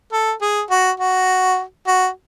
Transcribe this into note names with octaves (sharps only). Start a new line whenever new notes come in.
A4
G#4
F#4
F#4
F#4